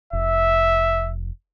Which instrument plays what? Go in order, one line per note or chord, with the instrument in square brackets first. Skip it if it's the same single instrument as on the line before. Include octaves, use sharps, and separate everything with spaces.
[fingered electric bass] F1 [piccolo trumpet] E5